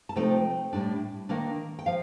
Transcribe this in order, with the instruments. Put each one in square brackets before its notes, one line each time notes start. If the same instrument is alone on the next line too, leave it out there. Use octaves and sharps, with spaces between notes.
[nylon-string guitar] A5
C3 F3 A3 C4 D#4 G5
A2 G3 D4
D#3 A#3 D4
G5
F3 F5